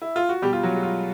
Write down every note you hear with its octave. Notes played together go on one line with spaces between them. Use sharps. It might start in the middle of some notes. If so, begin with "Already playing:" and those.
E4
F4
F#4
B2 G3 G4
F4
F#3 F#4
G#3
F4